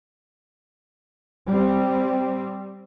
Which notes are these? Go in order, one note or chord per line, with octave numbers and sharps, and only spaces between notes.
G3 C4